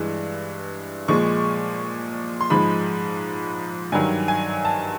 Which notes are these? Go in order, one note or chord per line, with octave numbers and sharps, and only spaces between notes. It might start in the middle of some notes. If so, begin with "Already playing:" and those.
Already playing: G2 E3 G#3
A#2 F3 G#3 C#6
C6
G#2 F3 G#3 B5
G2 D#3 F#3 G#5
G#5
A5